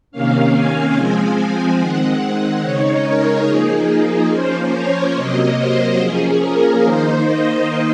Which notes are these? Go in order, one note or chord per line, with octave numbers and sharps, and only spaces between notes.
C3 D#3 A#3 C#4 F5
G#5
F3 G#3 C4 G#5
D#3 G#3 C4 F#5
C#3 G#3 D#4 C#5
A#4
F3 A#3 D#4 G#4
G#4
F3 A#3 C#4 C5
C#5
C3 F#3 A#3 D#5
C5
F3 A#3 C#4 G#4
A#4
D#3 A#3 D#4 C5
D#5